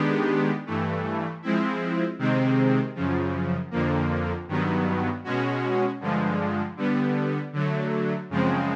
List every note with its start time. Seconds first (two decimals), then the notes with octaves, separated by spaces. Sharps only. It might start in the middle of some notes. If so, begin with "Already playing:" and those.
Already playing: D#3 G#3 B3 D4 G4
0.66 G2 E3 A3
1.42 F3 G#3 C4 E4
2.19 C3 D#3 G#3 C4
2.95 F#2 C#3 F3
3.71 F2 D3 F3 A#3
4.48 G2 D#3 F#3 B3
5.24 B2 G#3 C#4 F#4
6.00 G2 D3 F3 G#3
6.77 D3 G3 B3
7.53 D3 F#3 A3
8.30 F#2 C#3 F3 G#3 C4